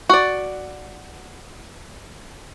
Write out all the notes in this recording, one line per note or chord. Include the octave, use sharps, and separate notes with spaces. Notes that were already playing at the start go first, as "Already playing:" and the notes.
F#4 D5